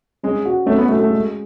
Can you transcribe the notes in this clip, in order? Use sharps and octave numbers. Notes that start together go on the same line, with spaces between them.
G#3 C#4
F#4
A3 C#4
B3
A3 F#4
A3
G#3